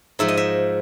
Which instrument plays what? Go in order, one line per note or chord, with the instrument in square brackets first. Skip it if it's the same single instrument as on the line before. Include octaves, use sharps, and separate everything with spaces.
[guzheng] G#2 F3 E5
D#5
E5